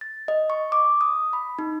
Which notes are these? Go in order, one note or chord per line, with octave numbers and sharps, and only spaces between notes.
A6
D#5
C#6
D6
D#6
B5
D#4